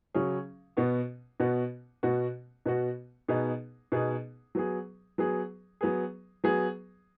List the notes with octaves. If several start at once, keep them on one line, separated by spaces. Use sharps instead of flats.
C#3 F#3 C#4 G#4
B2 B3 F#4
B2 B3 F#4
B2 B3 F#4
B2 B3 F#4
B2 B3 D#4 G#4
B2 B3 D#4 G#4
F#3 B3 G#4
F#3 B3 G#4
F#3 B3 G#4
F#3 B3 G#4